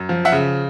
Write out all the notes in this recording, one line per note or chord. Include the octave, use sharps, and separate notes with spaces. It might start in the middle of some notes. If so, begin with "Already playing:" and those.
Already playing: F#2
F3
E5 F#5
C#3